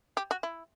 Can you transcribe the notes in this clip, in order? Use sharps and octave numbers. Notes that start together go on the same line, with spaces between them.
G4
F#4
E4